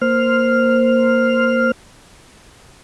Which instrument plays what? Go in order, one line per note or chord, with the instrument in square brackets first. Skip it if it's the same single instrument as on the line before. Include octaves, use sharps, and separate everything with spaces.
[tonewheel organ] A#3 C5 F6